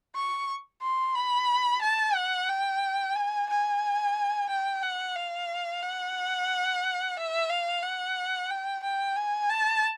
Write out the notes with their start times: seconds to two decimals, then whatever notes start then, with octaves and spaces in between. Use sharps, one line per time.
0.15 C#6
0.82 C6
1.16 B5
1.82 A5
2.15 F#5
2.49 G5
3.15 G#5
3.50 G#5
4.50 G5
4.83 F#5
5.15 F5
5.83 F#5
7.17 E5
7.50 F5
7.82 F#5
8.50 G5
8.83 G5
9.16 G#5
9.49 A5